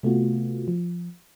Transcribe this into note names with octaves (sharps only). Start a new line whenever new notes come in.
C3 A3 B3 F4 F#4
F3